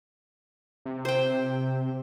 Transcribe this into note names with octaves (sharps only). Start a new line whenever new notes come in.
C3
C5 G5